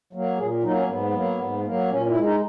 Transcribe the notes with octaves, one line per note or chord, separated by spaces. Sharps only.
F#3 A#3
A#2 G#4
F#3 A#3 D#4
C#4
G#2 B3
F#3 A#3
G#2
F#3 A#3
A#2 C#4
E4
G#3
D#4